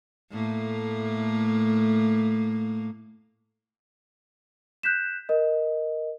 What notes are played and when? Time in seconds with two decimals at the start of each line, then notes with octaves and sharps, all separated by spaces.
0.31 A2 A3 A#3
4.83 F#6 G6 B6 E7
5.29 A#4 D#5